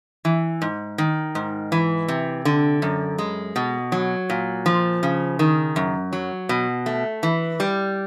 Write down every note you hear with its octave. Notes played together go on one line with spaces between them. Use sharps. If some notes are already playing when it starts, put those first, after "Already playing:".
E3
G#2
D#3
G#2
E3
C3
D3
F#2
G#3
B2
F#3
A#2
F3
C#3
D#3
F#2
F#3
B2
A3
E3
G3